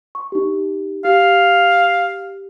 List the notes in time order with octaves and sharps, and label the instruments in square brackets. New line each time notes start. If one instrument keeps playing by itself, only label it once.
[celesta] C#6
D#4 G4
[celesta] G4 [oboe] F5